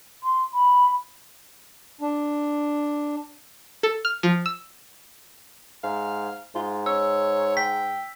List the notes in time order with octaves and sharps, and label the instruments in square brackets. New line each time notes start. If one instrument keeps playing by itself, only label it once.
[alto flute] C6
B5
[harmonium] D4
[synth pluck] A4
F6
F3
E6
[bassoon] G#2 [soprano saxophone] F5
[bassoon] G#2 [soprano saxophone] F4
[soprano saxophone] C#5 [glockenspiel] E6
[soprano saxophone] G5 [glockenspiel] B6